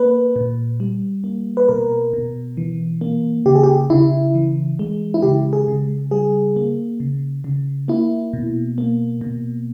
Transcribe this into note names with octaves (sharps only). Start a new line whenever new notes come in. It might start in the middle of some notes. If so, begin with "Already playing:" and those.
Already playing: A#3 B4
A#2
G3
A#3
B4
B2 A#4
B2
E3
A#3
C#3 G4
G#4
G4
C#3 E4
E3
G#3
E4
C#3 G4
G#4
C#3
G3 G#4
A#3
C#3
C#3
A#3 E4
B2
A#3
B2